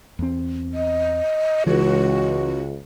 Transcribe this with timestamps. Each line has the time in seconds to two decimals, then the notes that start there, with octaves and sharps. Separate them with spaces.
0.19 E2 C4
0.74 D#5
1.67 C#2 E3 F#4